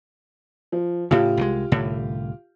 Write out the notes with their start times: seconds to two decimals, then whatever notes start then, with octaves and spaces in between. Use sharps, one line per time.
0.72 F3
1.11 A2 C#3 F4 G4
1.37 C2 E3 G#3
1.72 C2 A2 D3